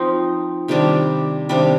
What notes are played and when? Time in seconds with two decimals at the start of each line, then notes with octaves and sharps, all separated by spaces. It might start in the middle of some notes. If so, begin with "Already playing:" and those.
Already playing: F3 C4 D#4
0.68 C3 D#3 G3 D4
1.49 C3 D#3 G3 D4